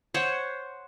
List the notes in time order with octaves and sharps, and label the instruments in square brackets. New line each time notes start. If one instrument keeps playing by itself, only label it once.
[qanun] C5 C#5 F#5